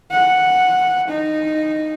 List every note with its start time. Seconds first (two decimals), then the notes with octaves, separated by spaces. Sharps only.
0.11 F#5
1.08 D#4